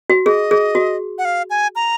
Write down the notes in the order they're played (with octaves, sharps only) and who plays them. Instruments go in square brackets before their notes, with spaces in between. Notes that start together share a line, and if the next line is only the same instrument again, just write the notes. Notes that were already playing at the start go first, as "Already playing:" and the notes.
[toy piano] F#4
[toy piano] G#4 [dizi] D#5
[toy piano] G#4
F#4
[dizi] F#5
F5
G#5
A#5